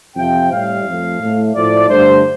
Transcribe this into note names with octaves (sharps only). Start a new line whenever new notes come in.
F2 C3 F3 G5
A2 G3 F5
F2 F3 A3
A2 A3
A2 F3 A3 D5
G2 D3 A3 C5